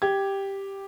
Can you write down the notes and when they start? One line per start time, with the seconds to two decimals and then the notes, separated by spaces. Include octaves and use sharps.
0.02 G4 G#6